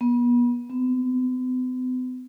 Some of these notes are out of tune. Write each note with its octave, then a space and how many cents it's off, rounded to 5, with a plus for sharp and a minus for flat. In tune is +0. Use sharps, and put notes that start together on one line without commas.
B3 -35
B3 +45